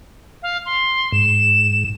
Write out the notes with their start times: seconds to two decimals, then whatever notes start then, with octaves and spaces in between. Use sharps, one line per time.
0.43 F5
0.66 C6
1.12 G#2 E7